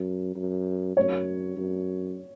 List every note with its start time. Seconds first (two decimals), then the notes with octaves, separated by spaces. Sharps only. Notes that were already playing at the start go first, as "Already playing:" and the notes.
Already playing: F#2
0.35 F#2
0.96 F#2 C#5
1.57 F#2